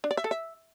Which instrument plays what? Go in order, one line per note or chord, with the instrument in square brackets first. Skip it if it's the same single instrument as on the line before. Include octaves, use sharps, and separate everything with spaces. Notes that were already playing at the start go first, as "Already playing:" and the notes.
[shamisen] D4
D5
E5
A4
E5